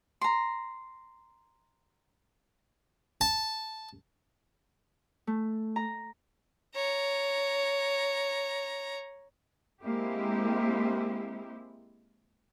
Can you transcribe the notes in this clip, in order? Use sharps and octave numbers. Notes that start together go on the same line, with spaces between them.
A#5 C6
A5
A3
A#5
C#5 A#5
G#3 A#3 C4 E4 G4